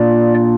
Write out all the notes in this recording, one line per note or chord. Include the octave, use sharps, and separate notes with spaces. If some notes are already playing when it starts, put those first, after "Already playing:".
Already playing: A#2 A#3 D4 F4 D5